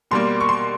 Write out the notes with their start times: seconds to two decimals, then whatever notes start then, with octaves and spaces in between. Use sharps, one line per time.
0.11 B2 G3 A#3 C6
0.40 C#6
0.49 C6